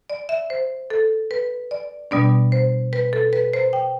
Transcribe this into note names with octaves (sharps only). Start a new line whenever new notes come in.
D5
E5
C5
A4
B4
D5
B2 G3 B3 D4 D5
C5
B4
A4
B4
C5
G5